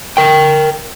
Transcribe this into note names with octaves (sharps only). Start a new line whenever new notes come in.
A#4 G5